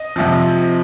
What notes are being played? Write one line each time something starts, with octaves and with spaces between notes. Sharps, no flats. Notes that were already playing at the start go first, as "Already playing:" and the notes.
Already playing: D#5
F2 C3 F3